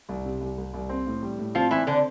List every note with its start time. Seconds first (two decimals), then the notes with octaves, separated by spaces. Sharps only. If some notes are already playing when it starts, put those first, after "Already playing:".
0.09 C2
0.25 C3
0.41 C2
0.58 C2
0.74 C2
0.89 C4
1.07 A2
1.22 G3
1.39 A2
1.55 F3 C4 F4
1.71 E3 C4 E4
1.87 D3 C4 D4